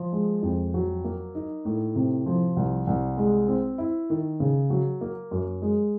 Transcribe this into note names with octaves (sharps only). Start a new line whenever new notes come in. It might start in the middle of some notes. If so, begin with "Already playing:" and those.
Already playing: F3
G#3
F2
F#3
A#3
D#4
A2
C3
F3
C2
C2
G#3
C4
E4
D#3
C#3
F#3
A#3
F#2
G#3